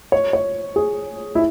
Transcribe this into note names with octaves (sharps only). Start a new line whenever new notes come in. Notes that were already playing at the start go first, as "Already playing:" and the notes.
C#5
C#5
G#4
E4